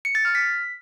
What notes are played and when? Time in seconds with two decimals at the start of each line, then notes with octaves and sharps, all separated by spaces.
0.05 C#7
0.15 A6
0.25 F6
0.35 B6